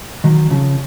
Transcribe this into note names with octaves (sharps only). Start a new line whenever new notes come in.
D#3 F#3
C#3 F3